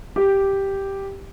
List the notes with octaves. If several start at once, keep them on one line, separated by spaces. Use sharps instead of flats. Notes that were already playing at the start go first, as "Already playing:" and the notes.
G4